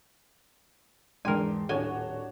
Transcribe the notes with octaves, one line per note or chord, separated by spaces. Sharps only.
E2 G#2 D4 A#4 G5 G#5 C6
D#1 A2 D4 F#4 C#5 G#5 G7